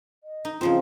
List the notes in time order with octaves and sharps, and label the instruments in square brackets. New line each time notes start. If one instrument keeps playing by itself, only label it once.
[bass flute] D#5
[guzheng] D#4
[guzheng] C#3 F3 C4 [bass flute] F4